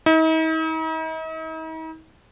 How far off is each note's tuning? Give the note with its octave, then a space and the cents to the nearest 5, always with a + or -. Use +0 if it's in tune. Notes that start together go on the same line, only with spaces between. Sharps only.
D#4 +45